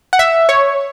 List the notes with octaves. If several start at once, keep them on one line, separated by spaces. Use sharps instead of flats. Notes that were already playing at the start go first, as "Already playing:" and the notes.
F#5
E5
C#5